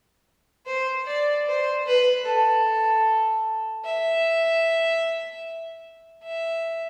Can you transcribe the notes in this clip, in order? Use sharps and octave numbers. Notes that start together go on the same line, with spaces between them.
C5
D5
C5
B4
A4
E5
E5